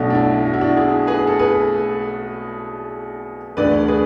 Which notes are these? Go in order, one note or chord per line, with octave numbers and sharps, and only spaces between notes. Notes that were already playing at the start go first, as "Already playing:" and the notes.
Already playing: B1 B2 A3 D4 F#4
D4
E4
F#4
E4
D4 F#4
E4 G#4
G#4 B4
A4
G#4 B4
E1 D2 D3 B4 D5
G#4 B4